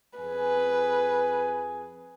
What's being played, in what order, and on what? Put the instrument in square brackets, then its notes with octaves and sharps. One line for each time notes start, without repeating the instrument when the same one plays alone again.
[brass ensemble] F2 G#4 G#5 [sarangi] B4